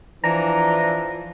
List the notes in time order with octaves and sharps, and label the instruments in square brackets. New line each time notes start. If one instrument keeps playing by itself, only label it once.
[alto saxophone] E3 [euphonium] F3 [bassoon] D4 [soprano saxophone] A#5